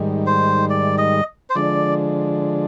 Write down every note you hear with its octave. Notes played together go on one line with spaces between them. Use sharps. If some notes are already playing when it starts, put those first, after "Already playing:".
Already playing: G#2 D#3 G3
C5
D5
D#5
C5
D3 F3 G#3 D4 D5